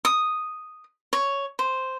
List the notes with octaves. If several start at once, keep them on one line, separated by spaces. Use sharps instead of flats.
D#6
C#5
C5